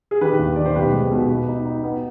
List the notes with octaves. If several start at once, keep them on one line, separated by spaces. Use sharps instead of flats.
G#4
D#3 G4 B4
D#2
D#3 D5
C5
B1 G4 B4
G#3
B2
B2
D#4
D#4
B3